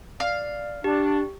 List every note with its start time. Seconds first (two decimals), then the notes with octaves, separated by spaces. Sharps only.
0.20 D5 F5
0.84 D4 G4 A5